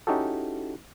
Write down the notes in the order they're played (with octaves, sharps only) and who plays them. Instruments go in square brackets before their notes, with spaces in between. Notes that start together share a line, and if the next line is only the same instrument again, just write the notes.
[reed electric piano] C#4 D#4 E4 F#4 G4 A4